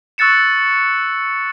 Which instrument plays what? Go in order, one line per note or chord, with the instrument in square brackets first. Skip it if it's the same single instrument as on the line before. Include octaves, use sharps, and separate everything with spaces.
[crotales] C#6 E6 F#6 A6 C#7 E7